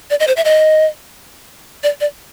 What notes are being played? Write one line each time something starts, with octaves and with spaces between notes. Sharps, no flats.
D5
D#5
C5
E5
D#5
D5
D5